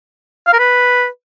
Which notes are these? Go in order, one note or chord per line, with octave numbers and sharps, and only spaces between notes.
F5
A#4
B4